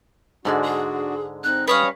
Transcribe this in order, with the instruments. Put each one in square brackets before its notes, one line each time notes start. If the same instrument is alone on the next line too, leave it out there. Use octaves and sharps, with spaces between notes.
[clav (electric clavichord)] G#2 D3 G#3 [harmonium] D4 F#4 [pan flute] D5
[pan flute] G#4
[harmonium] C4 D#4 [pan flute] F#6
[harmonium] G3 C#4 D#5 [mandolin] B4 C#5 F5 [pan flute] D#6